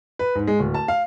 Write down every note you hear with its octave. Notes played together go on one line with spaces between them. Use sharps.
B4
G#2
G#3
D1
A5
F5